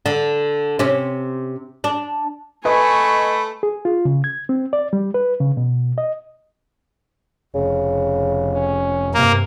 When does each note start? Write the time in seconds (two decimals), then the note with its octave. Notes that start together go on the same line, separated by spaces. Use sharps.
0.06 D3
0.79 C3 C#4
1.84 D4
2.65 A3 B4 D#5 G#5 B5 C#6
3.63 G#4
3.85 F4
4.05 C#3
4.24 G#6
4.49 C4
4.73 D5
4.93 G3
5.14 B4
5.40 C#3
5.57 B2
5.98 D#5
7.55 F1 C#3
8.53 C#4
9.14 G2 C3 A#3